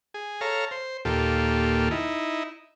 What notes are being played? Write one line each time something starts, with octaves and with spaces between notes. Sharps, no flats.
G#4
A4 C#5 F5 A#5
C5
D#2 A#2 F4 G4 A4
D#4 E4